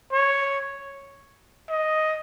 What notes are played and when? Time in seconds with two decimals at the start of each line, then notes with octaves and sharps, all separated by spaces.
0.12 C#5
1.69 D#5